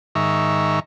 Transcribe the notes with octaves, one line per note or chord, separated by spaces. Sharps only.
G#2 D#3 E5 A#5 C#6